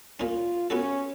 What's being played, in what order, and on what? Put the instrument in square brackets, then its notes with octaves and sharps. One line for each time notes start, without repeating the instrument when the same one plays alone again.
[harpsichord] A#2 C#4 [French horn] F4
[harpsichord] B3 F#4 A4 [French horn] C#4